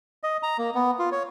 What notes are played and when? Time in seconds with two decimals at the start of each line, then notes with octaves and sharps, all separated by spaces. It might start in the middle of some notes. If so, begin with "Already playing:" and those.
0.23 D#5
0.43 A#5
0.58 A#3
0.75 B3
0.99 F4
1.12 C#5